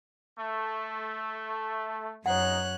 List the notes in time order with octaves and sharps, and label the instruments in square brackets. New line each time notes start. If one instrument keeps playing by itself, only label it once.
[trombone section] A3
[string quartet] F#2 C#5 F#6 [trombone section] G#3 D#4 [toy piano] F#5